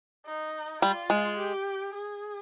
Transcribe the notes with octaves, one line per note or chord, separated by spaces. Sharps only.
D#4
G3 F4
G#3
G4
G#4